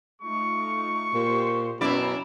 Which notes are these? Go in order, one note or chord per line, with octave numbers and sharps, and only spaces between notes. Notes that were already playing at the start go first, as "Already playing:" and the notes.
A3 D#4 F4 C#6
A#2 G4 C5 C6
F#2 B2 C#4 E4 D5 A#5 B5